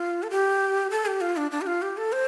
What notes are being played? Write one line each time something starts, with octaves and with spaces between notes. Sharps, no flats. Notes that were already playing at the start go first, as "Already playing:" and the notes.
Already playing: F4
A4
G4
A4
G4
F4
D4
D4
G4
F4
G4
A4
C5